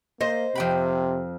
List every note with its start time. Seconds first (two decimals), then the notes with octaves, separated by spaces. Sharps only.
0.21 A#3 C5 D#5
0.55 F2 C3 G5 B5